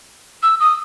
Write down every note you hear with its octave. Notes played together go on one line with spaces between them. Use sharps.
E6
D#6